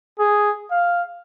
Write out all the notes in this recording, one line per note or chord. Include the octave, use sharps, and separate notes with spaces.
G#4
F5